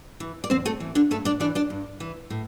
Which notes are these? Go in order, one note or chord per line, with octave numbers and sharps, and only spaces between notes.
E3
D5
E2 C4 C5
A3 A4
E3
D3 D4
G2 A3 A4
D4 D5
E3 D4 D5
D4 D5
G2
E3
A2